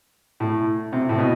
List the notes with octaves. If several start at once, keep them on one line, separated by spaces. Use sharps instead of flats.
A2
C3
A2
B2